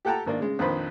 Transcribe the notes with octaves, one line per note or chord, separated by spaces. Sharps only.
G4 A4 F#5 G5 A5 A#5
G#1 A#3 D4
C#3 G#3
A#1 F2 D#3 F3 B4 C5